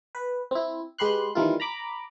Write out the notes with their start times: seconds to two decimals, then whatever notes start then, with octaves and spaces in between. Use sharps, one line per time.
0.15 B4
0.51 C4 E4
0.98 G#3 G4 B4 C6 F#6
1.35 D#3 E3 G3 A#3 E4 F4
1.60 A#5 B5 D6